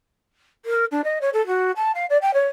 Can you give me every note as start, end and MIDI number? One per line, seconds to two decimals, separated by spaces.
0.65 0.85 70
0.91 1.01 62
1.04 1.18 75
1.21 1.30 73
1.33 1.45 69
1.47 1.71 66
1.76 1.91 81
1.95 2.06 77
2.10 2.17 74
2.22 2.33 79
2.34 2.48 73